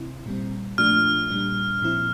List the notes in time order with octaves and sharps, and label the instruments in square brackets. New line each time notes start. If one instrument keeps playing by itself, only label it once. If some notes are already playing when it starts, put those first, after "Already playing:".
Already playing: [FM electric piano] C3 C4 E4
A#2 G3 C4
[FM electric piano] A#2 F3 A3 D4 F4 [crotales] F6
[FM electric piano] A#2 G3 D4
A#2 F3 C4 E4